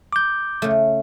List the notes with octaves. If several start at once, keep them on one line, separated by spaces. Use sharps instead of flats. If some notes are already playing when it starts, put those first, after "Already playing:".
D6 G6
C#3 A3